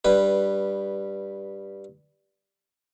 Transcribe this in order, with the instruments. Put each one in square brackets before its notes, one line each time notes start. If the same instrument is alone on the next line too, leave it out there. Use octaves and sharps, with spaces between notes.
[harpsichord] G2 G3 B4